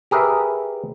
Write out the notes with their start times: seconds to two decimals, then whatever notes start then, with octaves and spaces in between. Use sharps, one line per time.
0.11 G4 G#4 A#4 B4 E5